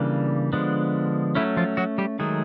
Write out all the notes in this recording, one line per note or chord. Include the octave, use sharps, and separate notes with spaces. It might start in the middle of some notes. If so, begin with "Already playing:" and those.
Already playing: C#3 E3 G3 A#3 D4
D3 F3 G#3 B3 D4
F#3 A3 C#4 E4
F3 F4
F#3 F#4
G3 G4
D#3 F#3 G#3 A3 G#4